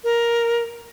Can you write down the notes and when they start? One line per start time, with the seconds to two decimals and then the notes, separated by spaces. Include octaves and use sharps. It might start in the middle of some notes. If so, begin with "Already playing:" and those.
0.04 A#4